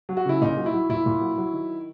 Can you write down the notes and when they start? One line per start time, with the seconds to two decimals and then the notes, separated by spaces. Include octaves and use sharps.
0.09 F#3
0.17 F#4
0.26 C#3 E4
0.41 A#2 D#4
0.57 F#3
0.66 E4
0.74 F#3
0.89 A#2 E4
1.06 A#2
1.21 F#3
1.38 F#3
1.53 D#3